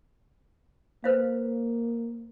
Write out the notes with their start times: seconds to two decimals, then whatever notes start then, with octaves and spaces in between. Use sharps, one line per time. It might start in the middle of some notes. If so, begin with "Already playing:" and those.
1.04 A#3 B4 C5 F5